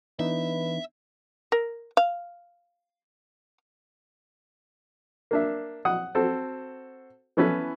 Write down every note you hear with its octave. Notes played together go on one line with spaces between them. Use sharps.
E3 B3 D4 D#4 B4 E5
A#4
F5
A#3 D4 E5
F#5 D#6
C4 F#4 A4
E3 B3 C#4 E4 A4 B4